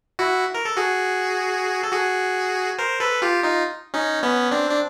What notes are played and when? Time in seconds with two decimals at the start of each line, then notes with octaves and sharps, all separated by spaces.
0.19 E4 F#4
0.55 A#4
0.65 A4
0.77 F#4 G#4
1.83 A4
1.92 F#4 G#4
2.78 A#4 C5
3.00 A4 B4
3.22 F4 G4
3.43 D#4 F4
3.94 C#4 D#4
4.23 B3 C#4
4.51 C4 D4
4.70 D4